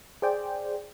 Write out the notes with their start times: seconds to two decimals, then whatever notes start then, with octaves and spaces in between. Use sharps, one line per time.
0.22 G#4 C5 D5 G5